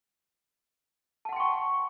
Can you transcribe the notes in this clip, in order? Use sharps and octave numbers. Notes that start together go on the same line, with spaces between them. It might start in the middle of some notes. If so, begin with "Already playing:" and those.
F#5 G5 A5 C6 C#6